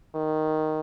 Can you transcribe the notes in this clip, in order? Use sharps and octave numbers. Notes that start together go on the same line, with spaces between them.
D#3